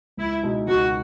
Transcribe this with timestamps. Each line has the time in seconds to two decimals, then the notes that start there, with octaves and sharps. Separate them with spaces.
0.17 C#2 E4
0.43 B2 G#3 D#4
0.68 C#2 F#4